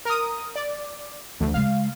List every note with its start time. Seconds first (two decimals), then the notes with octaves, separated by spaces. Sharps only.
0.05 A#4 D#6
0.55 D5
1.40 D2 E3 E4
1.54 C#3 G#3 F5